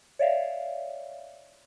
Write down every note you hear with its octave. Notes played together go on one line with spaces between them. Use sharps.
C#5 D5 E5 F5